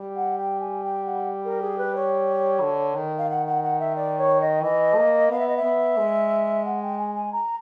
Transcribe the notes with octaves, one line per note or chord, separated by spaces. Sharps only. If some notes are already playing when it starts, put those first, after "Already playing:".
Already playing: G3
F#5
G5
G#5
G5
F#5
A#4
G#4
B4
C#5
D3
D#3
F5
F#5
F#5
F#5
E5
D5
C#5
D#5
E3 D#5
A#3
B3 F5
E5
D#5
E5
B3
G#3
F#5
G5
G#5
G#5
A#5